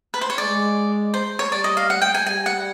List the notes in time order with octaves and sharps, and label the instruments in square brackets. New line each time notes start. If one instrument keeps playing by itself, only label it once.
[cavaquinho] B4
C5
C#5
[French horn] G#3 [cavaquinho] D5
[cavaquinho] C5
C#5
[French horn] G3 [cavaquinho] D5
[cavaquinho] D#5
F5
F#5
G5
G#5
[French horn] G3 [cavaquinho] G#5
[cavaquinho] F#5